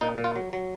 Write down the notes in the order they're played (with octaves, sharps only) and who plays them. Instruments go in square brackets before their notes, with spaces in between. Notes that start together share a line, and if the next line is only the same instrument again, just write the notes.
[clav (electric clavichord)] A#2 D#4
A#2
F4
F#3
F#3